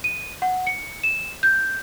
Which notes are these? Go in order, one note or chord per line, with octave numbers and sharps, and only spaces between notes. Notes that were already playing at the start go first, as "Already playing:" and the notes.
D#7
F#5
C#7
E7
G6